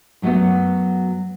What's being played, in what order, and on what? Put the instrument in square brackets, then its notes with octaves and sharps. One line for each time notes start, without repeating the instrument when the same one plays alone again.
[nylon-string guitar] F#2 F#3 G3 A3 B3